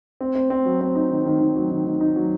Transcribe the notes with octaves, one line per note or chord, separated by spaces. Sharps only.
C4
C4
C4
F#3
C4
D#4
D#3
D#3
D#3
F#3
D#3
D#3
D#4
F#3